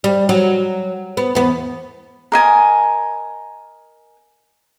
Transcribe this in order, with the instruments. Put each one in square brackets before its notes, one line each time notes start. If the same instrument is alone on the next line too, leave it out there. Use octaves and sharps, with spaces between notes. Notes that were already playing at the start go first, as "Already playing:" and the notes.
[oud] G3
F#3
B3
E2 B3
[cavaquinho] A#4 D#5 G#5